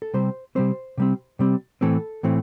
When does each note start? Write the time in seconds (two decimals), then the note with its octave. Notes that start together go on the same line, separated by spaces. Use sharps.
0.02 A4
0.14 C3 G3 C4 C5
0.55 C3 G3 C4 C5
0.98 C3 G3 C4
1.39 C3 G3 C4
1.81 A2 E3 A3 C4 A4
2.23 A2 E3 A3 C4